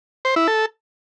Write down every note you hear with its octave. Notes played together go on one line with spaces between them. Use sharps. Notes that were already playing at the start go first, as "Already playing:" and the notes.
C5
E4
A4